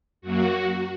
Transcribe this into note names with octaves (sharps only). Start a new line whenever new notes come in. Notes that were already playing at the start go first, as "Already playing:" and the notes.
F#2 F#3 A#3 F#4